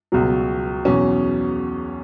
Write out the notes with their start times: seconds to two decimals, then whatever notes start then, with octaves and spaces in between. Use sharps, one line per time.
0.12 C#2 B2 F#3
0.85 E2 B2 F#3 C#4